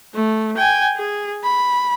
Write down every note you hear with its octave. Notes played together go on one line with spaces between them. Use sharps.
A3
G5 G#5
G#4
B5